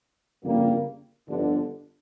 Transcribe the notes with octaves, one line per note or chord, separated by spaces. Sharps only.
G1 F2 C#3 G3 A#3
G1 F2 D3